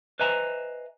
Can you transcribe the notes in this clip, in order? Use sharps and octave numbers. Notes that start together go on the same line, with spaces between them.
B4 C5 D#5 E5 G#5 A#5